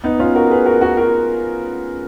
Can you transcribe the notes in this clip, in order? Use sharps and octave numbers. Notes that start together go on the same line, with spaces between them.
B3 D#4
C#4 F4
F#4 A#4
G#4 B4
F#4 A#4
F#4 A#4
F#4 A#4